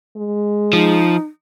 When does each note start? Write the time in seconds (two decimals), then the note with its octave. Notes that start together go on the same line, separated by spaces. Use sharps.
0.16 G#3
0.73 F3 D#4